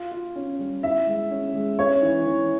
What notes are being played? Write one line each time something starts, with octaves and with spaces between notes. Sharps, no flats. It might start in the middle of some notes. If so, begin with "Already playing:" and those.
Already playing: F4
F4
C#4
G3
E4 E5
G#3
C#4
G#3
C#4 C#5
E3
E3